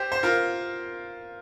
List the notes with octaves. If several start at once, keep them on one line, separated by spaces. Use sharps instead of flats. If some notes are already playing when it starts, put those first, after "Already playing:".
Already playing: G4 C5
C5
F4 A#4